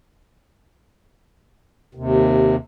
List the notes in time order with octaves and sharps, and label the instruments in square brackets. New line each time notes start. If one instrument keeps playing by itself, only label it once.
[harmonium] D#2 C3